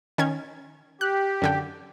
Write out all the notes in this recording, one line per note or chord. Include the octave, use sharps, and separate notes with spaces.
D#3 C#4 G#6
G4 F#6
F#2 D3 G5